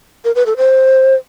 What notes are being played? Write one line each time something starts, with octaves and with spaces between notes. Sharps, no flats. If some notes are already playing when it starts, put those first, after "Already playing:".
A#4
B4
A4
C5